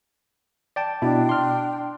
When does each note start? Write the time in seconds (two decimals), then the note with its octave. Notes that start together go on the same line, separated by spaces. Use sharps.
0.76 D5 G5 A5
1.02 B2 D4 E4 G5
1.29 C6 F6